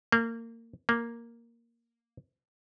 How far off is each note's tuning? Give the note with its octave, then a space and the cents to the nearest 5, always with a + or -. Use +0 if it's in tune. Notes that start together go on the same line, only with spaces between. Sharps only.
A#3 -25
A#3 +0